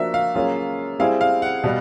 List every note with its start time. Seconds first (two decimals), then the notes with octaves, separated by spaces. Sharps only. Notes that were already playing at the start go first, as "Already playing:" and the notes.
Already playing: F3 A#3 D4 F#4 E5
0.14 F5
0.35 F#3 A#3 C#4 F4 G#4
0.99 G3 C4 E4 G#4 F5
1.21 F5
1.42 F#5
1.64 B2 G3